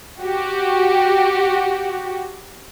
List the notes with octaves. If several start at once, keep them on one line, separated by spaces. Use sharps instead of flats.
F#4 G4